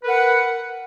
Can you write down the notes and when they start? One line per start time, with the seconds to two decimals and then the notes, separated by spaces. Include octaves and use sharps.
0.03 B4
0.06 A#4
0.09 F#5